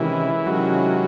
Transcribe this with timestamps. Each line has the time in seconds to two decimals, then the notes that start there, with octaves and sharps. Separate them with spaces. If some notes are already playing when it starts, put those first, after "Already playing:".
Already playing: C3 D#3 E3 G#3 C#4 E4
0.46 C3 D#3 F#3 G#3 C#4 E4